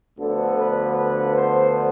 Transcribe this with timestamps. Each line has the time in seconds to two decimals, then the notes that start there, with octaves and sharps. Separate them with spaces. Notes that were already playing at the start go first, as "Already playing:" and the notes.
0.19 D2 D3 F3 B3 A4
0.58 B4
0.95 B4
1.34 C5